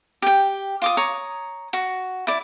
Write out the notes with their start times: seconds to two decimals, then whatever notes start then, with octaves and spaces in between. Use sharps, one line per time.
0.22 G4 G5
0.82 F4 D6 D#6
0.97 C#5 A#5 D#6
1.73 F#4
2.27 E4 D5